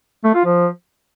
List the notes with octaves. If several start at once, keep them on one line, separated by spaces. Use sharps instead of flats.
A3
F4
F3